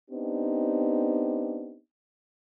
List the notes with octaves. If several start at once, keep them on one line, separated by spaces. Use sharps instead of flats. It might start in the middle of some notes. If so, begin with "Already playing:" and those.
B3 C4 D4 D#4 G4